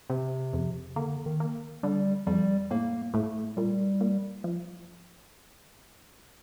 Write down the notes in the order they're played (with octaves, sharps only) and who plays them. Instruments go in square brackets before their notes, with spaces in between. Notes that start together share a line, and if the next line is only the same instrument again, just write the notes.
[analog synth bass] C3 [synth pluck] C4
[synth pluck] F2
[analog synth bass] D3 [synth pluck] A#3
[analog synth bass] D#3
[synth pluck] A#3
[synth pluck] D3 [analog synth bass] G3
[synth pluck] F2 [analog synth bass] G3
[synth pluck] A2 [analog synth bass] A#3
[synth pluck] A2 [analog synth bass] A3
[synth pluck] A#2 [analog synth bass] G3
[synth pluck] A#2
F3